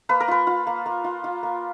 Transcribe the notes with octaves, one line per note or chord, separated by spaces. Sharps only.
A#3 B4
A#4
F4 B4
F4
A#3
A#3
F4
F4
A#3